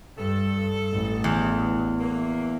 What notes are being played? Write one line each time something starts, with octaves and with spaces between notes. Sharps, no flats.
G2 A4
A1
E2
E3 A3 A#3